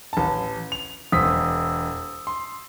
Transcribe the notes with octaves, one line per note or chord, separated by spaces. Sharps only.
A1 A5
F7
E1 C5 D#6 E6 B6
C6